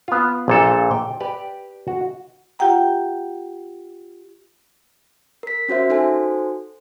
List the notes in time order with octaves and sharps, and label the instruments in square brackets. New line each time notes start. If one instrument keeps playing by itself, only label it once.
[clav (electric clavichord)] B3 F4
A#1 A#2 A4
G5
G4 B4 D5
F#4
[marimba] F4 G4 F#5 G5 A#5
[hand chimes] A#4 B6
C#4 F#4 C5 E5
D#4 F#4 A4 C5 G#5